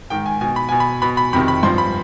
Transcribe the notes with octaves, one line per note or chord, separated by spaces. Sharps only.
G#2 D#3 G5
G#5
B2 G#5
B5
B2 G#5
B5
B2 B5
B5
F2 C3 D#3 B5
B5
G2 F3 C6
B5